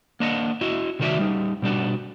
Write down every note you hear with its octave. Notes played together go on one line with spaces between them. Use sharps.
A#3 D4 D#5 F#5
E4 F#4 D#5
C3 D#3 A3 F#4 D5 E5
G3 D#4
B2 G3 D4 F#4